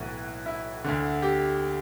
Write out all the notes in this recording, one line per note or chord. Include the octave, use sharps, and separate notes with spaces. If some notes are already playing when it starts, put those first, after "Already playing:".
Already playing: B1 A2 E3 F#4
E4
D2 D3
G4